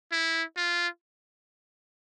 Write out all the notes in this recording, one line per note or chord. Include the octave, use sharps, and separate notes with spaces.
E4
F4